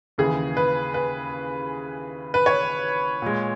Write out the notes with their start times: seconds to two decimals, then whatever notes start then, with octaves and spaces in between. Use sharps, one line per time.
0.18 D#2 C#3 E3 G#4
0.57 B4
0.94 B4
2.34 B4
2.46 C#5
3.22 A#2 G#3